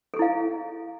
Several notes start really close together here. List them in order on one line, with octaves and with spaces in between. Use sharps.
A4 G#4 E4 F5